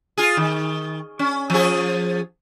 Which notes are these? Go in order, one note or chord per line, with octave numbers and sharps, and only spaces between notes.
F4 G#4
D#3
C#4
F3 G#4